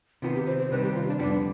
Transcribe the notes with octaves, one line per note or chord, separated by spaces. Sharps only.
C3 D#3 B3 F4
G4
C5
C5
C2 C3 D#3 G3 C4 B4
G4
F4
D4
F2 D3 G3 B3 D4